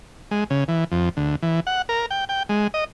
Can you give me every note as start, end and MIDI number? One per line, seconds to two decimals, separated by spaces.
0.31 0.44 56
0.50 0.64 49
0.68 0.84 52
0.92 1.09 41
1.17 1.36 38
1.42 1.60 52
1.67 1.82 78
1.89 2.06 70
2.11 2.25 79
2.29 2.43 79
2.49 2.67 56
2.74 2.84 75